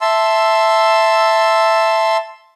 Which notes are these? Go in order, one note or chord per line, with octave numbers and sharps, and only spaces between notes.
E5 A5 C6 E6